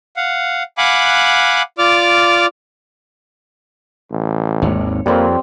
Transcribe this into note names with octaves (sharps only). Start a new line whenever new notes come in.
F5 F#5
F5 F#5 G#5 B5 D6 F#6
F4 D5 D6 F6
A1
G#1 D#2 C#5
F2 G3 A#3 C4 C#5